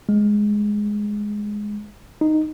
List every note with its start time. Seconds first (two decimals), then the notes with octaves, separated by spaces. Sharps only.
0.09 G#3
2.21 D#4